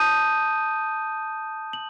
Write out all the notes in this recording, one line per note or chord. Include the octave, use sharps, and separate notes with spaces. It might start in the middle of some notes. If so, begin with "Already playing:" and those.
Already playing: A5 D#6 G6 D#7
F#7